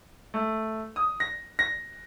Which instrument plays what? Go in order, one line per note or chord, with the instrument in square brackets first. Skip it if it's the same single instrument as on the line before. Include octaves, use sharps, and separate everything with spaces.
[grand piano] A3
D#6
A#6
A#6